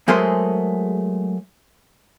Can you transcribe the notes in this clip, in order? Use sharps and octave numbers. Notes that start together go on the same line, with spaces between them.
F#3 G#3 A3 G#4 A#4 C5